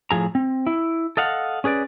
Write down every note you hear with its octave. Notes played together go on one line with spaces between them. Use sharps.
A2 F3 G#4 A#5
C4
E4
A4 D#5 F5 F#5
C#4 G#4 B4 D5